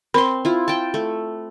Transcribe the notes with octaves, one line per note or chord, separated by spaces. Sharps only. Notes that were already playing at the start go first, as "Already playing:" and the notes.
C4 A#4 B5 C6
E4 F4
G5 A5
A3